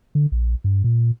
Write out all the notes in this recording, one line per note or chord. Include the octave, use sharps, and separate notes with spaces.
D3
A#1
G2
A#2